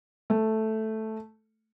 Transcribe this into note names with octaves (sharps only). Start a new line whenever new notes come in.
A3